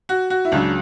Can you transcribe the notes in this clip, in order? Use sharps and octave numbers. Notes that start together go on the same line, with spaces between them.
F#4
F#4
E4
C#2 C#3 F#3 D4